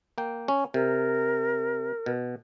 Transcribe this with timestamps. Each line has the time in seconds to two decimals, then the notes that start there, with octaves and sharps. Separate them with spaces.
0.18 A#3 G5
0.48 C#4
0.74 C3 A#4
2.06 B2